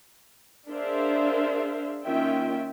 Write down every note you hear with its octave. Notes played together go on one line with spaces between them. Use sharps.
D4 G#4 A#4 C5 E5 F5
D#3 A#3 C#4 F4 E5 G5